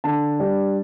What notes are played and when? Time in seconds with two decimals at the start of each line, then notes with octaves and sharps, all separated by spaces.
0.04 D3 A5
0.40 G3 D4